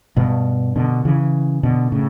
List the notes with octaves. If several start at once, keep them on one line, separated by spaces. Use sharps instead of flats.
G2 B2
B2 D3
C#3 E3
B2 D3
A2 C#3